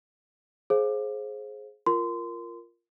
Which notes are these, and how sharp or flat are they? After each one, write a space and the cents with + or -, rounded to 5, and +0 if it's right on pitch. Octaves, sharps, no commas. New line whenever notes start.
G#4 +20 C5 +25 F5 +0
F4 -10 A#4 +0 C6 -25